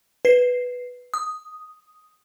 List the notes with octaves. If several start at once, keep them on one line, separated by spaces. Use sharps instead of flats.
B4 C7
D#6